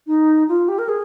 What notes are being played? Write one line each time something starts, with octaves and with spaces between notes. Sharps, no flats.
D#4
F4
G4
A#4
G#4